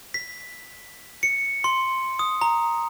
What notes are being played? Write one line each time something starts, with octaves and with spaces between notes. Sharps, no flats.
B6
C#7
C6
D#6
A#5